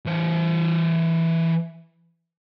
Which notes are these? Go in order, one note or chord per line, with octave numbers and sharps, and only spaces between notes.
E3 C5